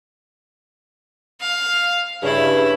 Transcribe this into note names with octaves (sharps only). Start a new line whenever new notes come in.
F5
G2 C#3 E4 E5